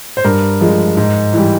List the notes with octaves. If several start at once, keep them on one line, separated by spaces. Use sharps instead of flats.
C5
G2 A#4
F3 G#3
G#2
E3 G3